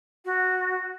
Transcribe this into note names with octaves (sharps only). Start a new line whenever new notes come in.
F#4